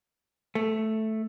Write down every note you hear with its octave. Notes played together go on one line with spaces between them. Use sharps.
A3